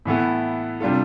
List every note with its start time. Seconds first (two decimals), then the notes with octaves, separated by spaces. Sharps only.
0.05 A2 E3 B3 E4 A4
0.80 C3 G3 D4 F4 A4